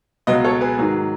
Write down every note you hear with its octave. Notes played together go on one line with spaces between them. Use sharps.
C#2 B2 F#3 B4 D#5
A4 C#5
G#4 B4
G#2 D#3 F#3